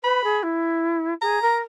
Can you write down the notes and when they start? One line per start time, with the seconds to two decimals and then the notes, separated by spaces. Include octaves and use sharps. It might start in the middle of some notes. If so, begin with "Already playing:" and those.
0.04 B4 B5
0.24 G#4
0.43 E4
1.21 G#4 A#5
1.42 A#4